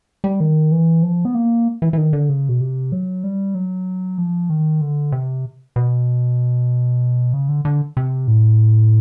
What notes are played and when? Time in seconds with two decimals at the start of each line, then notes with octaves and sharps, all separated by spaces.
0.24 G3
0.40 D#3
0.72 E3
1.03 F3
1.25 B3
1.35 A#3
1.82 E3
1.93 E3
1.98 D#3
2.13 D3
2.29 C#3
2.49 B2
2.61 C3
2.92 F#3
3.24 G3
3.55 F#3
4.18 F3
4.50 D#3
4.81 D3
5.12 C3
5.76 B2
7.33 C#3
7.49 D3
7.65 D3
7.97 C3
8.28 A2